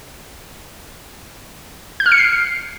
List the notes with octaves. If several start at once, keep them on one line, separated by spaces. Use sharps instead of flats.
G6
F6
C#7
C7